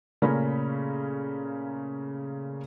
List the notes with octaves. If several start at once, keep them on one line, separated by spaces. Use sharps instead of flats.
A#2 C#3 A3 C#4 A#4 B5